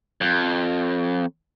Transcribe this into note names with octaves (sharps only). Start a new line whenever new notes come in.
F2